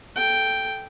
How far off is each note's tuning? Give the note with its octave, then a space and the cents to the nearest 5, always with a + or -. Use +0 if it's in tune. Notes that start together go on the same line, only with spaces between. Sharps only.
A4 -10 G5 +0